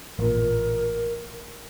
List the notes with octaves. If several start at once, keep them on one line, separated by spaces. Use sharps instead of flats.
A1 A#2 A#4